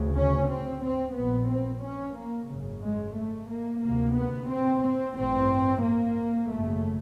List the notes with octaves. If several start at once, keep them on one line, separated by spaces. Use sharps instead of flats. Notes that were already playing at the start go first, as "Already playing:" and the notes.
Already playing: D2 C#3
C#4
C4
C4
A#1 A#2 B3
C4
C#4
A#3
G#1 F#2 C#3
G#3
A3
A#3
D2 C3 A#3
B3
C4
C4
A1 G2 C4
A#3
G#1 F#2 C#3 A3